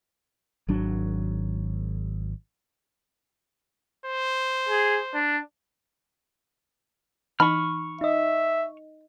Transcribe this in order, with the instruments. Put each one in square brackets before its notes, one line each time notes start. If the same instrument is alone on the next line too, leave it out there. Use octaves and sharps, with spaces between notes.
[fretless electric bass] G#1 F#3 D4
[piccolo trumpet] C5
[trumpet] G#4
D4
[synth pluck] E3 D#4 [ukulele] B5 [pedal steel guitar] C#6 F6
[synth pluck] D#4 D#5 [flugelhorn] E5